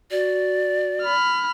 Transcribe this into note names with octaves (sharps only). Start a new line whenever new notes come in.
F#4 D5
B5 F6